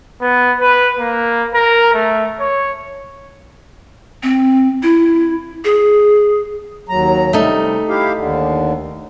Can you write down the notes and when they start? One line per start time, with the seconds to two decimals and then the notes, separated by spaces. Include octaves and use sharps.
0.21 B3
0.60 B4
0.99 A#3
1.54 A#4
1.93 A3
2.40 C#5
4.23 C4
4.83 E4
5.65 G#4
6.89 D#2 F#3 A#5
7.33 C3 G3 A3 D#4
7.89 E4 G4 F5
8.16 D#2 D3